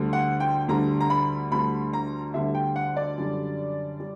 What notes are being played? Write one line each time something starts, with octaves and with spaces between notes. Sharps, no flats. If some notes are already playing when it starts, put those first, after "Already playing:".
Already playing: D2 D3 G3
F#5
G5
D2 D3 G3 A#5
A#5
B5
D2 D3 G3 B5
A#5
D2 D3 G3 E5
G5
F#5
D5
F#2 D3 G3
G3